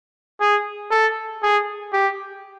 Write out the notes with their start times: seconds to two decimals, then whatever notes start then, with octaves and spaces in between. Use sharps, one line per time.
0.41 G#4
0.91 A4
1.43 G#4
1.93 G4